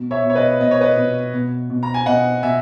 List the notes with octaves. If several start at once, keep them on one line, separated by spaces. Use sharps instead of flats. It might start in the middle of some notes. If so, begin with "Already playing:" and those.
Already playing: B2
C#5 E5
B2
C#5
B4 D#5
B2 D#5
C#5
B4 D#5
B2
B2
B2
A#5
G#5
B2 D#5 F#5
B2 E5 G#5